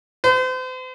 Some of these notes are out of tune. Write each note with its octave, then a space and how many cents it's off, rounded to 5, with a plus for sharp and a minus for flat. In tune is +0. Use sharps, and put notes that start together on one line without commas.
C5 -40